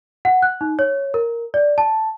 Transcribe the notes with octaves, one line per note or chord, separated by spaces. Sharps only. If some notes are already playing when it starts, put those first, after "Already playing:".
F#5
F#6
D#4
C#5
A#4
D5
A5